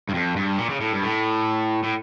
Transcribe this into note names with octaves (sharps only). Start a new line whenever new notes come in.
G2
F2
G2
A#2
C#3
A2
G2
A2
A2